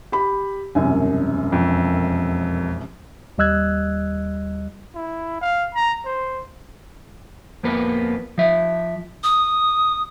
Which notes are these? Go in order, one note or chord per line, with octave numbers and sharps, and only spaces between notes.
G4 B5
E1 C2 F#2 G#5
F2
D#2 G3 D#5 E6 F#6 G#6
E4
F5
A#5
C5
F2 A#3 B3 B4
F3 E5
D#6